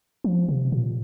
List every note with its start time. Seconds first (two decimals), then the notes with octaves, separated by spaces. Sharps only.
0.24 F3
0.49 C3
0.72 A#2